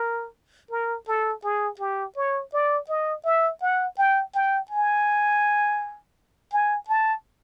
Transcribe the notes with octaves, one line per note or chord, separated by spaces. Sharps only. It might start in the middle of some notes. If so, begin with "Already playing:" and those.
Already playing: A#4
A#4
A4
G#4
G4
C#5
D5
D#5
E5
F#5
G5
G5
G#5
G#5
A5